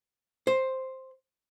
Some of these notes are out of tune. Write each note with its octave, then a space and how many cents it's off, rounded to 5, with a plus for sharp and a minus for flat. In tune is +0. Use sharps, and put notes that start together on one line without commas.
C5 +5